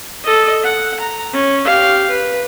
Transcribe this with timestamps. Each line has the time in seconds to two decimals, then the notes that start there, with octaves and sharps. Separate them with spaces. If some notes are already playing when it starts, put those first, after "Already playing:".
0.24 A4 D#5
0.64 F#5
1.00 A#5
1.33 C#4
1.65 G4 F5
2.10 B4